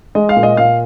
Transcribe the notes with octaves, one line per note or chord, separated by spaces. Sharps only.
G#3 D#5
F5
A#2
D#5
A#2 F5